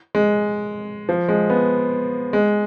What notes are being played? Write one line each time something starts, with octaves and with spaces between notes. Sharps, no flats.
G#3
F3
G#3
B3
G#3